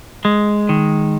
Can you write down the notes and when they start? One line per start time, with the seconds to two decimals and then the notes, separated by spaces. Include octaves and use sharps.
0.25 G#3
0.69 D#3